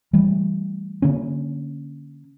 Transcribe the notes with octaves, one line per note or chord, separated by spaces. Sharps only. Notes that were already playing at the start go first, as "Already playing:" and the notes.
E3 G3 A3
D3 A#3 C#4